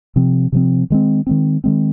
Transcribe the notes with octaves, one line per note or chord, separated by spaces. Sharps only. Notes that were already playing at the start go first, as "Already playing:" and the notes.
C3 F3 C4
C3 F3 C4
D#3 G#3 C4
D#3 G#3 C4
D#3 G#3 C4